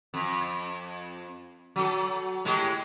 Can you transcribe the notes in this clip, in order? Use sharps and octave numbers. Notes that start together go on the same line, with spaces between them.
F2
F#3 A4
A2 G#3 G4